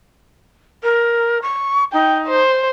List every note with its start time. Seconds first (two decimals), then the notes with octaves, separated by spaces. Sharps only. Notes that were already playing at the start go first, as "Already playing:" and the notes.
0.83 A#4
1.42 C#6
1.93 D#4 G5
2.27 C5